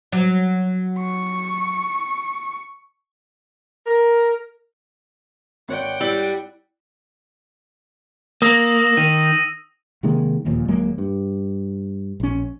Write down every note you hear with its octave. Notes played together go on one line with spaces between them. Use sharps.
F#3
C#6
A#4
G#1 C#5 D5 F#5 G5
G3 E4
A#3 D#6 E6 A#6
D#3 D#7
C3 D#3 G#3 A#3
D1 D#2 A#2 F3
D1 F#3 G#3 A#3
G2
A#1 C#4